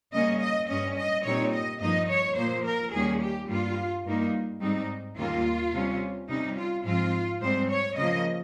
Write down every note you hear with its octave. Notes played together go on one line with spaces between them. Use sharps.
C#3 G3 A#3 C#4 D#5
D#5
G2 G3 C#4 D#5
D#5
A#2 G3 C4 D#4 C#5
D#5
G2 F3 A#3 D#4 D#5
C#5
A#2 F3 A#3 C5
A#4
D#2 D#3 G3 A#3 C#4 G#4
G4
G2 G3 A#3 F4
G2 G3 A#3 D#4
G#2 G3 C4 D#4
D#2 C#3 G3 A#3 F4
C3 G3 C#4
C3 G3 C#4 D#4
F4
G#2 F3 C4 F4
G#2 G3 C4 C5
C#5
C#3 F3 A#3 D#5